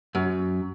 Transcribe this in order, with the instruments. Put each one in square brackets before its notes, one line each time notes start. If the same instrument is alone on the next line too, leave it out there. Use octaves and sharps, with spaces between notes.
[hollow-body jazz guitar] F#2